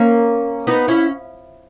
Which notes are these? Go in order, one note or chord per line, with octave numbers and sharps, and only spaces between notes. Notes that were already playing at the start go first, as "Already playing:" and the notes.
Already playing: A#3 C#4
B3 D#4
C#4 E4